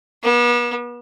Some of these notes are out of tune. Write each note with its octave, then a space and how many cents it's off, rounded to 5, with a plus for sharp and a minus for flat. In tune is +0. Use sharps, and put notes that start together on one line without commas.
B3 -40